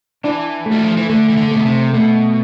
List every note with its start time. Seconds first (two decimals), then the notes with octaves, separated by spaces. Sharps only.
0.24 E3 D4
0.66 A3
0.71 G3
0.84 F3
0.97 E3
1.09 D3 A3
1.29 E3
1.37 D3
1.51 B2 A3
1.66 C3
1.93 B2 A3